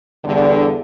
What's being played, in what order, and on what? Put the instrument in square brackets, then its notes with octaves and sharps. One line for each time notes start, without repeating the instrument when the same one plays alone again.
[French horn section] E2 G2 D3